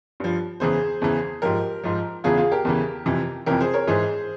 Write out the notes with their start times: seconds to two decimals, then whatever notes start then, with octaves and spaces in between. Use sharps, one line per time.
0.20 G2 F3
0.60 E2 C#3 E3 G#4 C5
1.02 E2 C#3 E3
1.42 G#2 F3 G4 A#4
1.83 G#2 F3
2.24 E2 C#3 E3 F4 G#4
2.37 F4 G#4
2.52 G4 A#4
2.65 E2 C#3 E3
3.06 F2 C3 E3
3.46 F2 C3 E3 G4 A#4
3.60 G#4 C5
3.74 A#4 C#5
3.88 G#2 E3 G#4 C5